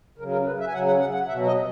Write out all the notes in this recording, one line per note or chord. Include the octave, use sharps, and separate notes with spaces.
C#3 F#3 A#4
A#4
B4
E5
G#5
C#3 F#3 F#5
F#5
F#5
F#5
B2 F#3 E5
D#5